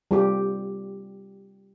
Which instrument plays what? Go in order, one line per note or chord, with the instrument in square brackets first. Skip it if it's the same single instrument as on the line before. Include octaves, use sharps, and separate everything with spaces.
[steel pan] G3 F4 G4